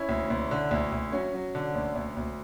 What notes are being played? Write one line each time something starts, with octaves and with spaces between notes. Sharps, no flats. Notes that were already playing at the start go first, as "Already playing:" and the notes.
Already playing: C#4 E4
D2
D2
D3
D2
D2
F#3 C#4
F#3
D3
D2
D2
D2